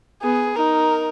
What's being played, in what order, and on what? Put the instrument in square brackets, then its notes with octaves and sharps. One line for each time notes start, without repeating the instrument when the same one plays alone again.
[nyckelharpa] B3 [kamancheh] G#4
[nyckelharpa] D#4 [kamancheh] A#4